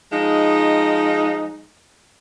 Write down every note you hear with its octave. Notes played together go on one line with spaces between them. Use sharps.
F3 G#3 D#4